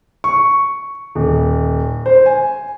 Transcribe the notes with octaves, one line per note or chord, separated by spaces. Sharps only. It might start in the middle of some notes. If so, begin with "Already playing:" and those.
C#6
D#1
C5
G#5